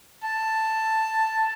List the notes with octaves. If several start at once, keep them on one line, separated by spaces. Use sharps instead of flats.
A5